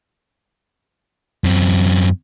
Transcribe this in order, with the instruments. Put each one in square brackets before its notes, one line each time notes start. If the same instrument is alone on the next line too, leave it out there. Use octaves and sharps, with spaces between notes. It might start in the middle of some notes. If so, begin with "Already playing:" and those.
[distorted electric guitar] F#2 C4